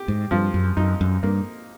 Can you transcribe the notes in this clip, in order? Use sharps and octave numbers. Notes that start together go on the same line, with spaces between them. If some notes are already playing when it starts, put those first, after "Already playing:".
Already playing: G4
G#2
G2 F3
F#2
F#2 D#4
F#2
G2 A#3